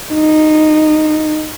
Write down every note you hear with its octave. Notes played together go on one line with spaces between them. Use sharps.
D#4